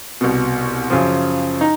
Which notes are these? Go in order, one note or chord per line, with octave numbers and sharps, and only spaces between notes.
C2 B2
F#2 C#3 F3
D#4